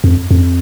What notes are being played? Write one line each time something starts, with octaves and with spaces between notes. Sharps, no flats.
F2
F2